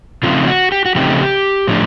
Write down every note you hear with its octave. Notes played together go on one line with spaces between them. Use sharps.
C#3 F3 A3 C4 D#4 F4
F#4
G4
F#4
C#3 F3 A3 C4 D#4 G4
A2 F3 A3 D4